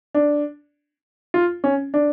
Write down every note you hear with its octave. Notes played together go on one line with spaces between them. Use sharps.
D4
F4
C#4
D4